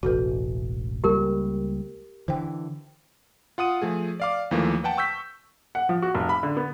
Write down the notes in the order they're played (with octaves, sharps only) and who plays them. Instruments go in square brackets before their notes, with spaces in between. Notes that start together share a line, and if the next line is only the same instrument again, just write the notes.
[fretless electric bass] E1 A1 [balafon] F#4 A4 B4
[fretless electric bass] C#2 G3 A#3 [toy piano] G4 A#4
[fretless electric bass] D3 E3 [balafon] C5 G5
[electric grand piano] F4 F#5 D#6 D#7
F3 A3 G#4
D5 F5 D6
D#2 E3 F3 A3 A#3
B4 F#5 G5 A5
C#6 E6 G6 B6
[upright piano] F#5
F3
F#4
F1
B5
D3
B3